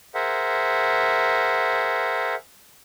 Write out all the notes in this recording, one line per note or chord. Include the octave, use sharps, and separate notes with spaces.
G#4 A#4 C5 E5 F#5